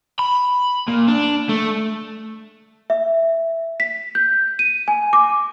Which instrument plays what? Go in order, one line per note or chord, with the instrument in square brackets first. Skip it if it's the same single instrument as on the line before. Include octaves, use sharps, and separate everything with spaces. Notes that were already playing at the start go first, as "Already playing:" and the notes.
[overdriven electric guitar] B5
A#2
D4
A3
[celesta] E5
B6
G6
D#7
G#5
D6